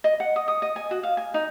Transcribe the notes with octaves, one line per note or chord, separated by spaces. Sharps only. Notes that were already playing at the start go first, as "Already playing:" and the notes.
D#5
F#5
D#6
D#6
D#5
G#5
F#4
F5
G#5
D#4